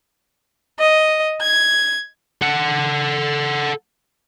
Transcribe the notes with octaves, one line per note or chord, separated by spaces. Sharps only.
D#5
G#6
A4 F#5